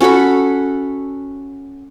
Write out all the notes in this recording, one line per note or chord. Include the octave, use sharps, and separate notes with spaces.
C#4 F#4 A4 B5